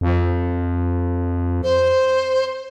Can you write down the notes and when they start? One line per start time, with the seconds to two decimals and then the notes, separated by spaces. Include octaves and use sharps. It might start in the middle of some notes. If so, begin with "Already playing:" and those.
0.01 F2
1.63 C5